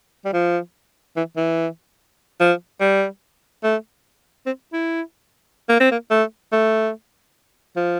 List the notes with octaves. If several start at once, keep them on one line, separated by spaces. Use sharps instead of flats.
G3
F3
E3
E3
F3
G3
A3
C4
E4
A#3
C4
A#3
A3
A3
F3